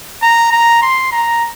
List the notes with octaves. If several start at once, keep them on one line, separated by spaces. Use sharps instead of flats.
A#5
A#5
C6
A#5